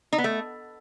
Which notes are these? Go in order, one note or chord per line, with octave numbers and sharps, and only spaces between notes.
D#4
B3
A3